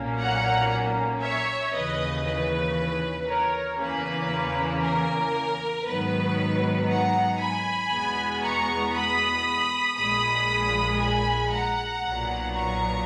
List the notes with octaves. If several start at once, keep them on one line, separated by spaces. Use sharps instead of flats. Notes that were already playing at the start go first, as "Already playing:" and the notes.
Already playing: B1 A#2 A#3 C#4
F#5 A#5
C#5 E5
D#2 C#3 E3 B4 D#5
B4
A#4 C#5
E2 C#3 E3 A#3 C#4 B4
A#4
G#2 D#3 F#3 B3 B4
F#5 A#5
G#5 B5
E2 B2 G#3 B3
A#5 C#6
B5 D#6
A#1 A#2 G#3 B5 D#6
G#5 B5
F#5 A#5
B1 A#2 F#3 B3
A#5 C#6